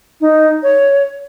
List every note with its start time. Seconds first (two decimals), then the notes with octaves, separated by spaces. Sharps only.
0.21 D#4
0.63 C#5